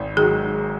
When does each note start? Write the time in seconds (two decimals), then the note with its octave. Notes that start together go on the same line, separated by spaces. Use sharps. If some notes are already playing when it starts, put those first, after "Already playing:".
Already playing: G#1
0.17 G#2 D#3 F#3 G#4